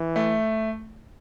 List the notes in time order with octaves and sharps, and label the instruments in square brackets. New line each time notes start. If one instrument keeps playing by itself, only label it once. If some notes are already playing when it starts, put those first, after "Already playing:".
Already playing: [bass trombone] E3
[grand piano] A3